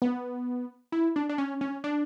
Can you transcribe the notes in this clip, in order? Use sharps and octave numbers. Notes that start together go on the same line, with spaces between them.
B3
E4
D4
D4
C#4
C#4
D4